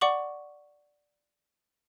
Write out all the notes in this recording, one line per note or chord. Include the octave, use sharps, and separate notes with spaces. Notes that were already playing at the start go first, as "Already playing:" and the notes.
D5 F#5 C#6 D6 F#7